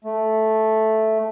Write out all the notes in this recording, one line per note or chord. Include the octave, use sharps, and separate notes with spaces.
A3